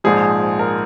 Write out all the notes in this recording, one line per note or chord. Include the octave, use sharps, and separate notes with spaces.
A#1 G#2 F3 G#4
A#4